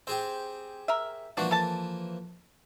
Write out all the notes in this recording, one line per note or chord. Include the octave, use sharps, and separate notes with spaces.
C4 G4 G#4 C5
A#4 E5
E3 F3 A#3 D4 F#4
A4 A5